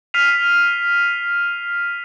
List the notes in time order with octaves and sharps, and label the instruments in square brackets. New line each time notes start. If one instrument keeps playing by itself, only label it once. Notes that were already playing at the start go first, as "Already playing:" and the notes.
[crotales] F6 B6 C7 D#7 F7